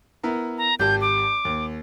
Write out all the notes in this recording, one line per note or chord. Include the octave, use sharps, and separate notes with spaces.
B3 E4 A#4
A#5
G#1 G4 A5 G6
D6
D#2